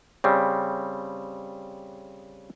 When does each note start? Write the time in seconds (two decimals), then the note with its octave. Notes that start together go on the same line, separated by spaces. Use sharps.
0.24 C#3 G3 C4